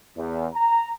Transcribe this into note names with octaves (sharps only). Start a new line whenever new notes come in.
E2
A#5